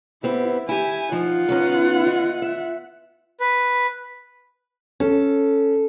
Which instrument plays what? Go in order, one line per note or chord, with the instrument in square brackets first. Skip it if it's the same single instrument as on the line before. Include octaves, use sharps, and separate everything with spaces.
[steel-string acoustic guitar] B3 C4 G4 [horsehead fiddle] E4
[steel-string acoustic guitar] E4 G4 [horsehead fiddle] G#5
[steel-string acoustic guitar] F3 D#4 [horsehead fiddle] F4 F#5
[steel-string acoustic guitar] B3 C#4 D#4
E4 D#5
E5
[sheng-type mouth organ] B4
[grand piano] C#4 [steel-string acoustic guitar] A4